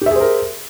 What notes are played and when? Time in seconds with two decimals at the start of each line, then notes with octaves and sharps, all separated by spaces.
0.01 G4
0.06 E5
0.11 G#4
0.16 C5
0.20 A#4